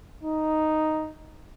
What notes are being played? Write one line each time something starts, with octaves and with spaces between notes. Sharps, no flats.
D#4